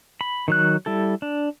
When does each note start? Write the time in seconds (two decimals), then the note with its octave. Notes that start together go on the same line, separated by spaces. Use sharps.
0.21 B5
0.48 D#3 F#3 F#6
0.86 G3 E4 A4
1.22 D4